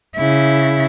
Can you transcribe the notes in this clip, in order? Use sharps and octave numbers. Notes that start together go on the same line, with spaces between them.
C#3 E4